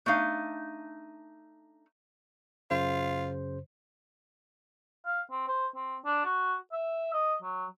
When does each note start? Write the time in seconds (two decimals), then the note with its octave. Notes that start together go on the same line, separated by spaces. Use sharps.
0.06 A3 D4 D#4 F5
2.71 F#2 C#3 F4 C5
5.06 F5
5.31 C4
5.48 C5
5.75 C4
6.05 D4
6.25 F#4
6.72 E5
7.13 D#5
7.42 F#3